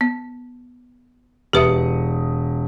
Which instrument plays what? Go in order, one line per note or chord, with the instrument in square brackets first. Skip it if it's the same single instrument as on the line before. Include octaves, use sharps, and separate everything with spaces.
[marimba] B3
[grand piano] E1 D#6 C#7 [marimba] G4 B4 E5